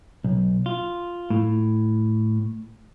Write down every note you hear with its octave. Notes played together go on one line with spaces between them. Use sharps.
B1
F4
A2